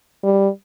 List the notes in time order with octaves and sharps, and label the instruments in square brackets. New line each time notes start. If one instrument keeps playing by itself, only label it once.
[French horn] G3